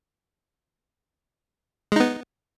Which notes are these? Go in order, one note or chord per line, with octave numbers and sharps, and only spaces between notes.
G#3 B3 D#4